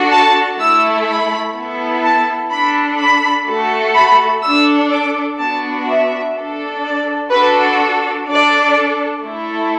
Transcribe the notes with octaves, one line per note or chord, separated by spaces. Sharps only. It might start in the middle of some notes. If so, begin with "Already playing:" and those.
Already playing: D4 F#4 A4
A5
A3 E4 A4 E6
B5
B3 E4 A4
A5
D4 A4 B5
B5
A3 F#4 A4
B5
D4 A4 E6
D6
B3 D4 F#4 A5
E5
D4 A4
D5
D4 F#4 A4 B4
D4 A4 D5
A3 E4 A4